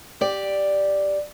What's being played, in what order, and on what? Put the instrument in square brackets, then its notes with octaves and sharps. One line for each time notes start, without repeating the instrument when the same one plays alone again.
[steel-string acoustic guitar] G4 D5